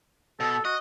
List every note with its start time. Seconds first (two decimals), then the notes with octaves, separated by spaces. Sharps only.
0.40 B2 A4
0.65 F#4 D#5